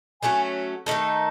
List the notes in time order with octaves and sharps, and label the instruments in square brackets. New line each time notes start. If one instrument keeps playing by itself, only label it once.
[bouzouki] F#3 A3 C#4 F#4 [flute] G#5
[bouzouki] D#3 A3 D#4 A4 [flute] A5